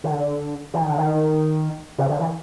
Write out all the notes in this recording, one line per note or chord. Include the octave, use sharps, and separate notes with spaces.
D#3
D3
E3
D#3
D3
D#3
C#3
D3
E3